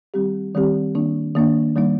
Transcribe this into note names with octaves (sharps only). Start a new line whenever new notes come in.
D#3 G3 C4 G4
D#3 G3 C4 G4
D#3 A#3 D4
D#3 A#3 D4
D#3 G3 A#3 D#4